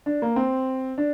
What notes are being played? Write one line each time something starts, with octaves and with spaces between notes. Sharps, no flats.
D4
A#3
C4
D4